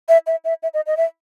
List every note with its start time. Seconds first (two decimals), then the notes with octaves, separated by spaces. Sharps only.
0.09 E5
0.27 E5
0.45 E5
0.63 E5
0.74 D#5
0.87 D#5
0.97 E5